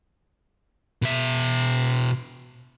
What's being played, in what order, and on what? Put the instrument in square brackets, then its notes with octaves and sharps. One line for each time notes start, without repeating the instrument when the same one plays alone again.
[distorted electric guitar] B2 E5